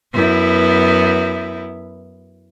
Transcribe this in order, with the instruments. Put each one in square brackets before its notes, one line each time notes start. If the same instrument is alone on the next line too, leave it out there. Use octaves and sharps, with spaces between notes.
[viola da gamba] F#2 B3 E4